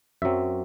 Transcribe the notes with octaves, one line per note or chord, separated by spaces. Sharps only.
F#2 F#3 C4 E5